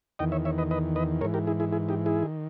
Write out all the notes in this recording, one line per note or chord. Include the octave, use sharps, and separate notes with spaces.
E2 D#3 D#5 G5
C#5 E5
C#5 E5
B4 D#5
B4 D#5
B4 D#5
G#2 E3 A#4 C#5
G4 A#4
E4 G#4
E4 G#4
E4 G#4
D#4 G4
E4 G#4
D#3